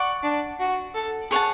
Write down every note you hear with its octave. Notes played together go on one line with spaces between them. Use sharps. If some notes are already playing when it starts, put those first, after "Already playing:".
Already playing: D5 F#5 C#6
D4
F#4
A4
G#4 C#5 F#5 A5